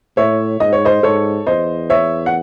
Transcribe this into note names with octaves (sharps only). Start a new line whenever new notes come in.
A2 C#5 E5
G#2 D#5
C#5
C5 D#5
G#2 A4 C#5
E2 C5 D#5
C#5 E5
F#5